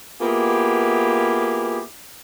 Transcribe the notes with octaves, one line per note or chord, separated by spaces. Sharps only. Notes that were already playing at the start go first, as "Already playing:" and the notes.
A#3 B3 E4 F4 G4 G#4